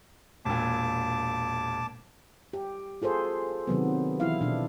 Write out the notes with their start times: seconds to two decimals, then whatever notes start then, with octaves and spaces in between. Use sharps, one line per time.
0.45 E1 A#2 A5 D6
2.53 G4
3.02 F4 G#4 A4 C5
3.67 C3 D#3 F#3 B3
4.20 E3 E4 F5
4.41 B2 D4